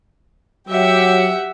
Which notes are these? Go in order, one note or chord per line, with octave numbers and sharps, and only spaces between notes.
F#3 G4 E5 F#5